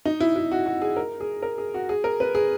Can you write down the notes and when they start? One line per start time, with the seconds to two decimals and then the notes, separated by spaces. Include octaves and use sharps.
0.05 D#4
0.20 E4
0.36 E4
0.52 F#4
0.66 F#4
0.82 G#4
0.97 A#4
1.20 G#4
1.42 A#4
1.58 G#4
1.74 F#4
1.89 G#4
2.04 A#4
2.20 B4
2.35 G#4